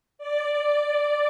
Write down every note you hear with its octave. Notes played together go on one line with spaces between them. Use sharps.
D5